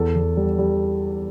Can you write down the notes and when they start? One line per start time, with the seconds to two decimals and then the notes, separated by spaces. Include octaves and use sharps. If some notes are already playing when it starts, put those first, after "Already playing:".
Already playing: E2 A4
0.15 E2
0.37 G3
0.59 G3